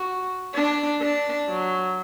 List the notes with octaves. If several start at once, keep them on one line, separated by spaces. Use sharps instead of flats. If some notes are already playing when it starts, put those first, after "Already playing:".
Already playing: F#4
D4
D4
F#3